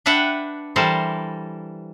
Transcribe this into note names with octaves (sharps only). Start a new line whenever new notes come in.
D4 B4 E5 F#5 G5
E3 G3 A4 A#4 C5